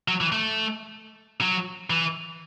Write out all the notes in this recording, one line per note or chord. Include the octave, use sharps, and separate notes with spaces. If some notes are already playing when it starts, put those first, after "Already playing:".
F#3
E3
A3
F#3
E3